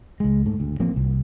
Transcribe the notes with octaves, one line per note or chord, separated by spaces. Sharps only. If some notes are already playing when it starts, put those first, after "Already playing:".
C#2 G#3
G#2 A3
D2
A1 F3 A#3 C4
C2